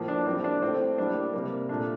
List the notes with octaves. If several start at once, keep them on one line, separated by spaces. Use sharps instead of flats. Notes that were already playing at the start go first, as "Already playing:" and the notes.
Already playing: A2 F3 A#3
D4
A2 G3 A#3 C4
D4
A2 A3 C4
A2 G3 A#3 D4
C3 G3 A#3
A#2 A3 D4